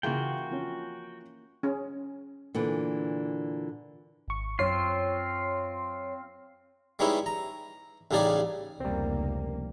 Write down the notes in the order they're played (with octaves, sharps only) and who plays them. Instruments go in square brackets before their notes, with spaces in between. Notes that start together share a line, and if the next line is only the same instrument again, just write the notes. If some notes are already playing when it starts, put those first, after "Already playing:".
[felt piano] C#3 G#4 [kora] E3 A#3 F4 [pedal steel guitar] F#4 G5
[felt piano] F3 C#4
[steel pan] C#4 G#4
[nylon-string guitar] A#2 D3 E3
[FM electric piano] G#1 C#6
[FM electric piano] F#2 C#5 C7 [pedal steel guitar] C4 F4
[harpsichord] G3 G#3 B3 C#4 D#4 E4
A#5
A1 C#3 G3 D#4 G#4 D5
[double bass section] F1 C#2 A#3 [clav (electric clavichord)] G3 C4